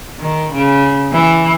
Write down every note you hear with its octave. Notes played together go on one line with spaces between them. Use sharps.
D#3
C#3
E3